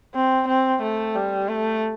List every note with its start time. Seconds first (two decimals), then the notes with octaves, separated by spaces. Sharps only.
0.15 C4
0.48 C4
0.82 A3
1.16 G3
1.48 A3